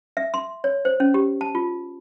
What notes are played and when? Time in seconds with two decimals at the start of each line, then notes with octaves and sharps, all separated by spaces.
0.17 E5
0.34 C6
0.64 C#5
0.85 C5
1.00 C#4
1.14 G4
1.41 A5
1.55 F4